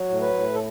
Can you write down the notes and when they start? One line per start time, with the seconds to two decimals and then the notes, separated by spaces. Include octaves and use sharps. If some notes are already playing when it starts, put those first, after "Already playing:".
Already playing: F#3
0.09 A2
0.22 B4
0.34 A2
0.54 A4